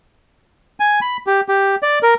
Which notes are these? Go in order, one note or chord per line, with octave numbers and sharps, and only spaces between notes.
G#5
B5
G4
G4
D5
A#4